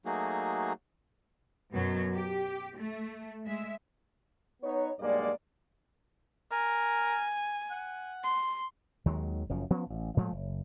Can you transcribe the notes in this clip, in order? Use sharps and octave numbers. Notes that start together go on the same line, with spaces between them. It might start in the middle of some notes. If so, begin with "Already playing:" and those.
F#3 A3 A#3 D#4 F#4 G#4
F#2 B2 F#3
G4
A3
G#3 E5
B3 D#4 C#5
B1 G2 G#3 A#3 D5
A#4 G#5
F#5
C6
D#2 D#3 F#3 G#3
F#1 F#2 F3
F3 B3 C#4
A1
A2 F3 G#3 A3
F#1